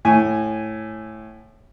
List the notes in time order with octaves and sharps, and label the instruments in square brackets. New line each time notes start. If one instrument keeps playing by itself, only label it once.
[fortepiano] A2 G#5